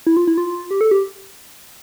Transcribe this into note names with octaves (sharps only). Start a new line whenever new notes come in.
E4
F4
E4
F4
G4
A4
G4